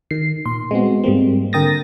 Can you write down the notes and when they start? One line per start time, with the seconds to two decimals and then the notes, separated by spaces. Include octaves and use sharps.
0.11 D#3 C7
0.46 A#2 C6
0.71 G#3 B3 C4 F#4
1.04 G#2 G3 A#3 C4
1.53 D3 A#4 G5 D#6 A6 A#6